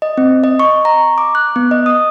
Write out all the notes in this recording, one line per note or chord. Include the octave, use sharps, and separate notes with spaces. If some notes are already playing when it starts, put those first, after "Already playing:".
D#5
C4
D#5
C#6
A#5
D6
F#6
B3
D#5
D#6